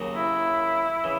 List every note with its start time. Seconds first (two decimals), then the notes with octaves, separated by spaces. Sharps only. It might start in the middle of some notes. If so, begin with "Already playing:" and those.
Already playing: D#2 C#3 F#3 A#3
0.15 E4
1.04 C#3 E3